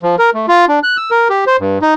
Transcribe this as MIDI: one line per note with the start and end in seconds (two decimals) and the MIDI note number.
0.03 0.16 53
0.19 0.30 70
0.34 0.46 57
0.48 0.65 65
0.68 0.79 62
0.83 0.97 90
0.97 1.11 88
1.11 1.28 70
1.29 1.44 67
1.47 1.57 72
1.60 1.78 43
1.82 1.94 63